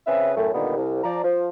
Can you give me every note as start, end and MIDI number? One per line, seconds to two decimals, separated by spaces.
0.07 0.32 49
0.07 0.32 60
0.07 0.32 68
0.07 0.32 71
0.07 0.32 76
0.37 0.49 42
0.37 0.49 45
0.37 0.49 57
0.54 0.73 46
0.54 0.73 50
0.54 0.73 51
0.54 0.73 55
0.54 0.73 58
0.54 0.73 59
0.76 1.01 36
1.04 1.21 53
1.04 1.21 74
1.04 1.21 82
1.24 1.49 53